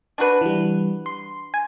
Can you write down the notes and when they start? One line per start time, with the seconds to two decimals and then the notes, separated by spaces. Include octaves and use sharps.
0.18 D4 F#4 B4
0.41 E3 G3
1.06 C6
1.54 G#5